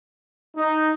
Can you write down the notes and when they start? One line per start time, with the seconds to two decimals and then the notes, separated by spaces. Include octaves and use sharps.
0.57 D#4